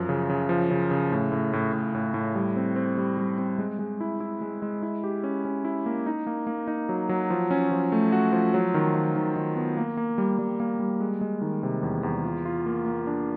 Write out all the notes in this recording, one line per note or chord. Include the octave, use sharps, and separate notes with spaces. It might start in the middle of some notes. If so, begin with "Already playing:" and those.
Already playing: F#2 F3
C#3
C#3
F3
C#3
C#3
A2
A2
A2
A2
A2
A2
G3
C4
C4
G3
G3
C4
G#3
G#3
E4
E4
G#3
G#3
E4
G4
C#4
C#4
E4
A#3
D#4
A#3
A#3
D#4
F#3
F#3
F3
C#4
F3
A3
F#4
F3
F#3
D#3
D#3
D#3
D#3
B3
A#3
A#3
G3
G3
A#3
G3
G#3
G#3
D#3
C3
E2
E2
F4
F4
A#3
A#3
D4